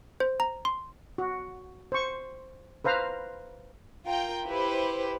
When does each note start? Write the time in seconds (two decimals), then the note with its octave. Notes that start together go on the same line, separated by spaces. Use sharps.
0.20 C5
0.40 A#5
0.65 C6
1.18 F#4
1.92 C5 C#6
2.85 B4 C5 F5 A#5
4.05 F4 A#4 G5
4.47 E4 G4 B4 C5